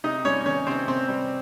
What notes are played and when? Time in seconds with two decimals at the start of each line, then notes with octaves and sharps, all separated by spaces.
0.04 C3 D#4 D#5
0.25 G3 C#4 C#5
0.46 D#3 C#4 C#5
0.67 C3 C4 C5
0.88 C3 C4 C5
1.08 G3